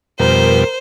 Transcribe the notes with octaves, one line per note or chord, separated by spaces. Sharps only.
F2 B2 G3 A#4 C5